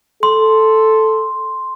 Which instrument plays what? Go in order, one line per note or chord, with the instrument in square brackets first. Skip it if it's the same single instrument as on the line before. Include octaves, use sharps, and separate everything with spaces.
[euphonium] A4 [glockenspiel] C6